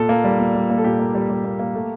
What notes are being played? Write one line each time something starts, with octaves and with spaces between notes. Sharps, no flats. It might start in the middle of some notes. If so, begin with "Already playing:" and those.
Already playing: A#2 A4
A#3
G3
A#2
G3
A#3
A4
A#2 G4
A#3
G3
G3
A#3
A#3
A3